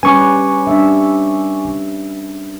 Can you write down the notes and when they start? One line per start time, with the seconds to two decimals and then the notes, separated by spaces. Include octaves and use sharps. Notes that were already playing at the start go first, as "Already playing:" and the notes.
0.03 G3 C#4 B4 G#5 C#6 D6
0.67 G3 D4 E5